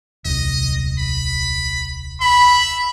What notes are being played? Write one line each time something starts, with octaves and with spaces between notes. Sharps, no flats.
D#1 C2 D#5
B5
E5 B5